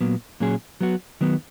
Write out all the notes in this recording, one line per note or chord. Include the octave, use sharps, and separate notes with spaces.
A#2 F#3 B3
A#2 F#3 C#4 G#4
F#3 B3 F#4
D#3 F#3 B3